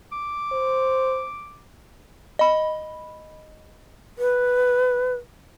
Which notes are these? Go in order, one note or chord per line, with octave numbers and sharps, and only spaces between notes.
D6
C5
D#5 B5
B4